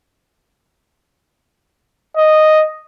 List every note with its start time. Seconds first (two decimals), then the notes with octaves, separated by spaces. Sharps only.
2.17 D#5